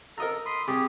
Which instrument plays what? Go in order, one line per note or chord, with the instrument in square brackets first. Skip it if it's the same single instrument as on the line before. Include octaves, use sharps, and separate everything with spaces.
[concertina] A4 [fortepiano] A#4 D#5 A#5
[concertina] B5 C6 D#6
[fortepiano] C2 [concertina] G4 G#4